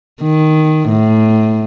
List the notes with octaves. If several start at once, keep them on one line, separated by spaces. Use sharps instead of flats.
D#3
A2